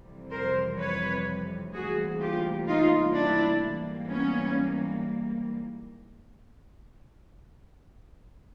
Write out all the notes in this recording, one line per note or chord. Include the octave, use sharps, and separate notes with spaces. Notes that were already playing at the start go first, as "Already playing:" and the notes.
Already playing: F2 C3 E3 G3
A#4 C5
B4 C#5
D2 C3 E3 G3 A#3 F#4 G#4
F4 G4
D#4 F4
D4 E4
G#2 E3 G3 A#3
B3 C#4